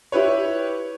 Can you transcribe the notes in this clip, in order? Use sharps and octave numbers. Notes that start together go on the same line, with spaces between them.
E4 G4 B4 C#5